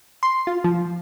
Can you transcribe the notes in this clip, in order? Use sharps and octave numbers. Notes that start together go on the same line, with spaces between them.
C6
F4
F3